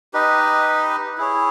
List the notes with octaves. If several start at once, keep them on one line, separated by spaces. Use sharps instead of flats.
D#4 G4 B4 D#5
E4 G#4 C#5